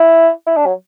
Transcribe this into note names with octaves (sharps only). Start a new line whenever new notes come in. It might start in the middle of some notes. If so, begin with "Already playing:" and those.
Already playing: E4
E4
D4
F#3